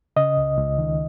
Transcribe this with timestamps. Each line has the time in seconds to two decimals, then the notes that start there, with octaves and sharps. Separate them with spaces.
0.16 C#3 D#5
0.37 C#2
0.58 C#2
0.79 D#3